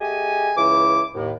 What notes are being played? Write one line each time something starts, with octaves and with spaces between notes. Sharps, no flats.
A3 G4 G#4 D#5 G#5
C#2 E3 E4 D6
D#2 A2